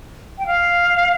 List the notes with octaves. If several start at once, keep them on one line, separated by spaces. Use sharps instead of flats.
G5
F5